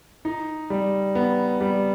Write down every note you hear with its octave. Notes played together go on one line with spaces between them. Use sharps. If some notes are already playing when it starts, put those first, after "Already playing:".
D#4
G3
B3
G3